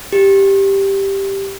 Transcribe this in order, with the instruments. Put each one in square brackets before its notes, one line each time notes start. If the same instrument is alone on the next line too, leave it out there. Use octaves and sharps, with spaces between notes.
[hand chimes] G4